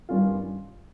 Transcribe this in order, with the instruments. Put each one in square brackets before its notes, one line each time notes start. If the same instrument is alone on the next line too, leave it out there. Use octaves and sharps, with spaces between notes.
[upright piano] G2 D#3 G3 C#4 F4